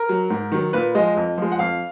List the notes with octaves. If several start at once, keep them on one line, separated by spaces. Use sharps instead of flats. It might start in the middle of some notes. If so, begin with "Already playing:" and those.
Already playing: A#4
F#3
G#2
D#3 F#3
A#2 B4
F3 G#3 D#5
F2
F3 G#3
F#5
F2 F5